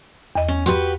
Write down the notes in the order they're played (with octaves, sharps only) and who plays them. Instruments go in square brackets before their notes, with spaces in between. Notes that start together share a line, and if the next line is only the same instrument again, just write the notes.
[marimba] E2 D#5
[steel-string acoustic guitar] C#4
[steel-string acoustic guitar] F#4 G4 B4 [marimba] C6